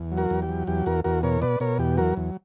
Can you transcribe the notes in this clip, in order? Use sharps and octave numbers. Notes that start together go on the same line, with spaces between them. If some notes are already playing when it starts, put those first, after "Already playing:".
Already playing: E2
F#3
F#4 A#4
E2
G4
F#3
E2 G4
E2 F#4 A#4
E2 F#4 A#4
B2 A#4 C#5
B2 B4 D5
B2 A#4 C#5
E2 G4
F#3 F#4 A#4
E2